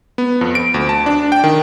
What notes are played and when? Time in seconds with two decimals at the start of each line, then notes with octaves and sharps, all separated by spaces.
0.18 B3
0.41 F2
0.55 D7
0.74 D2
0.89 A5
1.06 D4
1.32 G5
1.44 D#3